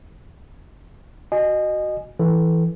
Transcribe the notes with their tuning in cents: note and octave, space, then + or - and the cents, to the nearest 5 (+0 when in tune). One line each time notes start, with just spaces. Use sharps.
F#4 +0 D#5 -20 G#5 +0
E3 +0 A4 -10